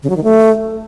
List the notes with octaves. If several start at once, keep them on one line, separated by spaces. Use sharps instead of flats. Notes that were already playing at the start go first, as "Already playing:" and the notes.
C#3
F#3
D#3
A3